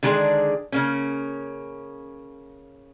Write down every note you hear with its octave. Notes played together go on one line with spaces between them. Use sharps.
D3 D#3 G#3 D4 G#4
C#3 A#3 C#4